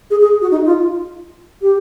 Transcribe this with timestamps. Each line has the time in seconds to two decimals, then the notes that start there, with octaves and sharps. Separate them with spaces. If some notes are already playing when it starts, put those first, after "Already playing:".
0.11 G#4
0.21 G#4
0.41 F#4
0.51 D#4
0.66 F4
1.62 G4